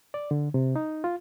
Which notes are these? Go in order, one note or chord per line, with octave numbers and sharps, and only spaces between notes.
D5
D3
C3
D#4
F4